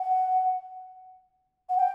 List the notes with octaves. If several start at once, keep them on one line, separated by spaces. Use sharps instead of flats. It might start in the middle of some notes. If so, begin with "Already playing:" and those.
Already playing: F#5
F#5
G5